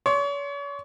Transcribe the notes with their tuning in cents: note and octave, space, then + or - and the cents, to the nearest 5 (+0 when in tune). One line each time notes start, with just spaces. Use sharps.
C#5 +40 C6 +35